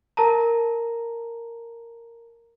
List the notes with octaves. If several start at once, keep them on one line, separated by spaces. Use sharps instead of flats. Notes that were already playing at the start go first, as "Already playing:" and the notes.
A#4 A5 A#5